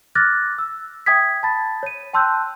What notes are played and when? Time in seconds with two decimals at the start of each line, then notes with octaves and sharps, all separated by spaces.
0.15 D6 F6 F#6 A6 A#6
0.58 E6
1.06 E5 G5 D#6 G#6 B6
1.43 A5 B5 A6
1.83 C#5 D#7
2.14 G5 A5 C6 E6 F#6 G6